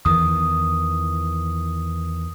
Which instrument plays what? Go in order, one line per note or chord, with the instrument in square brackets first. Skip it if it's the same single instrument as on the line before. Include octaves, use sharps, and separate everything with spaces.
[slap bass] E2 D#3 E3 [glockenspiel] D#6